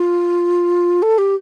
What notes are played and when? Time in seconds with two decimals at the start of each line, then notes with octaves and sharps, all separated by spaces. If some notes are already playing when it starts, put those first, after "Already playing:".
Already playing: F4
1.02 A4
1.18 G4